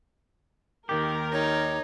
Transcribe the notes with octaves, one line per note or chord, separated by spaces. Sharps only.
D#2 D#3 G4 A#4
D#4 C#5